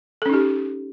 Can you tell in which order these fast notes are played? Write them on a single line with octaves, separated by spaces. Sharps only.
A4 C#4 D#4 G4